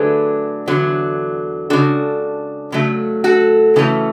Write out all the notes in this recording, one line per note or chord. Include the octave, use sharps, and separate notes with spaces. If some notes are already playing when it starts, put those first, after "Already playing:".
Already playing: D3 F#3 A3 D4 G#4 B4
E2 D3 F#3
C#3 G#3 D4 F#4 A4
C#3 F#3 A3
F#4 A4
C#3 E3 A3 C#4